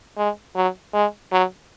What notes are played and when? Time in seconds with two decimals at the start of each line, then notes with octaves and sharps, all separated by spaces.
0.18 G#3
0.56 F#3
0.94 G#3
1.32 F#3